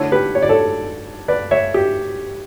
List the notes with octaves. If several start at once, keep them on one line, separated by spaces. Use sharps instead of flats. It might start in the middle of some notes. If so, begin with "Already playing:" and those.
Already playing: D3 A3 E4 A4 C#5
G4 B4
C#5
D5
A4 C#5
B4 D5
C#5 E5
G4